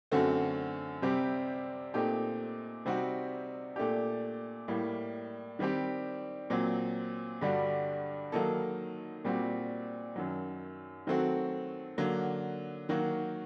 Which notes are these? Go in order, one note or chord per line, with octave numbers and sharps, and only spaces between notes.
F#2 D3 A3 C4 F#4
C3 G3 C4 G4
A#2 A3 C4 D#4 G4
C3 G3 C4 D#4 F#4
A#2 A3 D4 G4
A2 G3 A#3
D#3 G3 C4 G4
A#2 F#3 C4
G2 D3 G3 D4 F#4
D#3 F#3 A#3 D#4 A4
A#2 G3 C4 F#4
F#2 D#3 F#3
D#3 F#3 A3 C4 F#4
D3 F#3 A#3
D#3 F#3 A#3 F#4